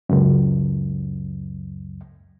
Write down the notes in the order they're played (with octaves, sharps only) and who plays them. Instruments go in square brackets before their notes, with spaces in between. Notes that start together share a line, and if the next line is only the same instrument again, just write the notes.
[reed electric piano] C#2 F#2